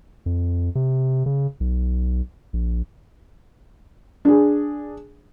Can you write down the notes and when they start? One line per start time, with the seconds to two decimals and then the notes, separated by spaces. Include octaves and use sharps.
0.26 F2
0.75 C3
1.26 C#3
1.60 B1
2.53 A#1
4.25 D4 G#4